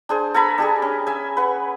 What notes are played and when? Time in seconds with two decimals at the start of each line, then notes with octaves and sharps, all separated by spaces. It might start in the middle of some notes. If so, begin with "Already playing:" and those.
0.09 D4 G#4 C5
0.34 A4 G#5 A#5 B5
0.58 D4 G4 G#4
0.82 C#4
1.07 E5 G#5
1.37 B4 F#5